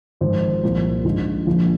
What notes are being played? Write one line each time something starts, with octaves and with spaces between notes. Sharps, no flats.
G#1 G#2 F3 C5
C2 A#2 F3
A#1 G#2 F3
A#1 A#2 F3